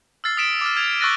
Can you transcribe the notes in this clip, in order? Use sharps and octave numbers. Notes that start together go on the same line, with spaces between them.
E6 F6 A6 C7
D#6 B6 D7 E7
D6 F6
F6 G#6 F7
C#6 E6 F#6 A6 A#6 D#7